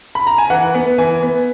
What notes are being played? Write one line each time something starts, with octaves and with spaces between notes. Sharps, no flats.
B5
A#5
G#5
E3 F#5
B3
E3 G#5
B3